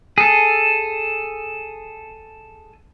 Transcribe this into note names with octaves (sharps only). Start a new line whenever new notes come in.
G#4 A4